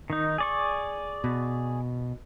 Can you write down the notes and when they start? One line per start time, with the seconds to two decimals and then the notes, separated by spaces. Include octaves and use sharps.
0.10 D#3 D#4
0.38 G#4 D5 C#6
1.24 B2